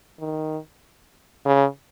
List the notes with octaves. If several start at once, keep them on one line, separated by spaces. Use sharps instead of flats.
D#3
C#3